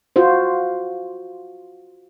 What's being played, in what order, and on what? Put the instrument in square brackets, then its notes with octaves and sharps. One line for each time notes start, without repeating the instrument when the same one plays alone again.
[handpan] F4 F#4 C5